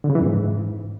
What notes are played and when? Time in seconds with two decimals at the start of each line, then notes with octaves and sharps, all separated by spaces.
0.04 D3
0.10 C#3
0.15 E3
0.21 F2
0.26 G#2